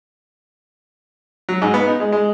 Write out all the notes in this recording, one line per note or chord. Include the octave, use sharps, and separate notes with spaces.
F#3
G#2
B3
D#4
G#3
G#3